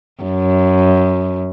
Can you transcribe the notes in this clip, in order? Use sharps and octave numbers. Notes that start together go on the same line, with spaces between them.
F#2